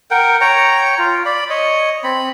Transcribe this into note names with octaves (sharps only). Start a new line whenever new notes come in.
A#4 F#5 G5
C#5 G5 A#5
F4
D5 B5
C#5 D#5
C4 B5